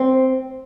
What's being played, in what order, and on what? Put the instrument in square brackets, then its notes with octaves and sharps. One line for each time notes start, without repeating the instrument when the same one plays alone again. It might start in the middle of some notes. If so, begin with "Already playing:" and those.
Already playing: [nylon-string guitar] C4